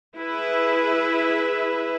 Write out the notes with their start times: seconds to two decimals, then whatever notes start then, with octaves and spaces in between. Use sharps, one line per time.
0.16 E4 G#4 B4 E5